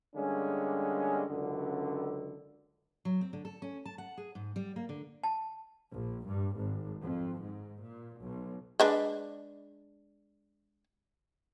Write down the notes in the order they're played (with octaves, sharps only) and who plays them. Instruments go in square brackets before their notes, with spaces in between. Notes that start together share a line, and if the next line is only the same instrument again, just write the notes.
[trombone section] D3 G3 G#3 A#3 C#4
C#2 F#2 D3
[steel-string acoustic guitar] F#3
C4
D3
A4
C#4
A5
F#5
G#4
G#2
G3
A#3
D3
[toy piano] A5
[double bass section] A#1
G2
G#1
F2
G#2
A#2
B1
[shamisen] G#3 D4 B4